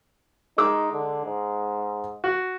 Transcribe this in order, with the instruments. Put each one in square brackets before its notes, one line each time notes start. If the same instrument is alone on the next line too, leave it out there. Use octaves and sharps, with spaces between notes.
[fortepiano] G#3 D6 E6 [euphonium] D#4
[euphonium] D3
G#2
[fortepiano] F#4